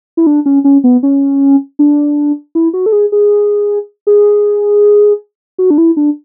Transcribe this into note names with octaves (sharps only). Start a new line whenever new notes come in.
E4
D4
C#4
C#4
B3
C#4
D4
E4
F#4
A4
G#4
G#4
G#4
F#4
D4
E4
D4